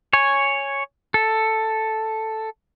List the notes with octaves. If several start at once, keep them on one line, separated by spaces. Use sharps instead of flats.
C#5 G#5
A4